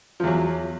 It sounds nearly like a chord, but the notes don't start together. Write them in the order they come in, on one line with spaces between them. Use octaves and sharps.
F3 E2 F#3